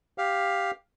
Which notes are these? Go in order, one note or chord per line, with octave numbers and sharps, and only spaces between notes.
G4 F5